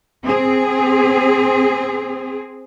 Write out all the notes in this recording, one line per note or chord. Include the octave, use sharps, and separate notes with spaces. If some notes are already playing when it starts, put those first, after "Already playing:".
C4 G#4